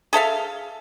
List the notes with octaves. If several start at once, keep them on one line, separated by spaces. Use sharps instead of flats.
G#4 A4 E5 F5